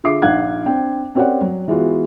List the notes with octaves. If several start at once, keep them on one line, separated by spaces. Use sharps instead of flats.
D3 F4 G#4 E5 D6 C7
A#1 D#4 F5 F#5 F#6 G#6
C4 D4 G5
C4 C#4 G4 A#4 D5 F#5
F#3
E3 G#3 B3 F4 F#4